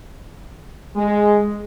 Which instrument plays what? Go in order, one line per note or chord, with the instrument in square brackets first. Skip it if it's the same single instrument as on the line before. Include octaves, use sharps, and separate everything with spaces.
[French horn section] G#3